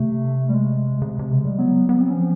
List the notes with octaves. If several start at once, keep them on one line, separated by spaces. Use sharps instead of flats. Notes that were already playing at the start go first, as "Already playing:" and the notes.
Already playing: C3 A3
G3
G#3
C#3
C3
C3
C#3
G3
F#3 B3
B3
C4
F3 C#4